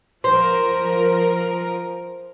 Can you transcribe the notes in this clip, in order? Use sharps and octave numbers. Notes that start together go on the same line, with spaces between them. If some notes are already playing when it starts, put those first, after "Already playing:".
F3 A#4 C5